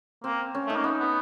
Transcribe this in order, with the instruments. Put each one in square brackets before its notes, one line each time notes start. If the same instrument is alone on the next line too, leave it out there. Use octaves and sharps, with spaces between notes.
[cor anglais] A#3 [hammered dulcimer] C4
[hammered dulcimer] C#4
[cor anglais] A3 [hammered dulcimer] D#4
[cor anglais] A#3
[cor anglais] B3 [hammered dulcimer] D#4
[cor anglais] B3